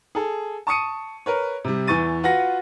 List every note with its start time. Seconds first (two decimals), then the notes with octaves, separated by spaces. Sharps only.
0.15 G#4 A4
0.67 A5 C#6 D#6 C#7 D#7
1.26 A#4 B4 C#5
1.64 C3 G3
1.87 E2 E3 C#6 A6 D#7
2.23 F4 F#4 B4 F#5 A#6